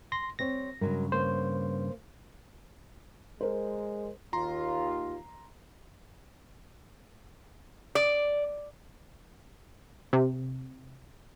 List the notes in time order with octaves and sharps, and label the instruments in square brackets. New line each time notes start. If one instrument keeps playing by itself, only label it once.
[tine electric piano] C6 A#6
[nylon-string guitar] G3 C4 C#5 [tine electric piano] A#6
[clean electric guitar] G2 C#3 [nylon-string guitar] F#3 G#3 A#4
[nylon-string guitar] A#3 B3 C#5 [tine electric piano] C5
[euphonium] G#3 [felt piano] A#4 C5
[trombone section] D#2 F4 [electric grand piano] A#5 C6
[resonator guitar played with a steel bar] D5
[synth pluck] C3